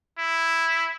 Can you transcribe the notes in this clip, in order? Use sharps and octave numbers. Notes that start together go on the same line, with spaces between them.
E4